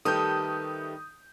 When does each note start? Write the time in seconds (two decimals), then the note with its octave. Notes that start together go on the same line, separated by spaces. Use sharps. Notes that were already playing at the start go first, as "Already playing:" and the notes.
0.05 D#3 G3 A3 G4 A4 B4 D#6 G6